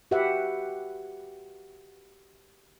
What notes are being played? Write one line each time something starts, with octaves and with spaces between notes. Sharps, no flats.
F#4 G4 B4 E5 F#5